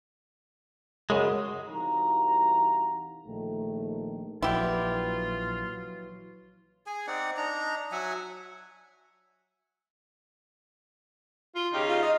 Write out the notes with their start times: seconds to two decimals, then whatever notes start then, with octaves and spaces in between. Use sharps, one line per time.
1.10 F#2 C#3 G#3
1.69 C2 E3 D#4 F#4 F5 A#5
3.27 A#1 D#3 A3
4.42 A#1 E3 F#3 E4 F4 G4
6.87 G#4 G#5
7.07 C4 D#4 D5 F#5
7.37 D4 D#4 A#5
7.92 F#3 E5 F#5 G#5
11.55 F4
11.74 C#3 D#4 G4 F5
11.88 F4
12.02 D#5